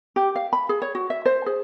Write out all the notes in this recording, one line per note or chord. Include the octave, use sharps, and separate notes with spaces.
G4
F5
B5
G#4
C#5
F#4
E5
C5
G#4